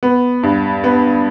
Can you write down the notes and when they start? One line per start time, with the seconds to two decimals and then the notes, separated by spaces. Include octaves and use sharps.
0.03 B3
0.43 G2
0.84 B3